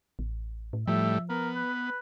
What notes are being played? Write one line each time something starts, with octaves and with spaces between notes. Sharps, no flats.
A1
A2
A2 F3 G3 E5
B3 A#4
B4